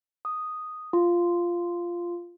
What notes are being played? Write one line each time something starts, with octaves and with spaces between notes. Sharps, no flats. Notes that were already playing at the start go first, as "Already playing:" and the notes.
D#6
F4